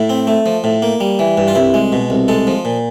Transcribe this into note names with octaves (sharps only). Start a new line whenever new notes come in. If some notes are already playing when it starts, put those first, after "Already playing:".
Already playing: A2 E4
C4
A3
F3
A2
A#3
G3
E3
G2
F4
C2 E4
G#3
B2
C2
G#3 A4
F3
A#2